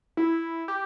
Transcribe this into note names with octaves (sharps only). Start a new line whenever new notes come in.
E4
G4